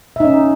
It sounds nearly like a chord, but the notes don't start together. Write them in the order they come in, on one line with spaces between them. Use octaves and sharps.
E5 D#4 C#4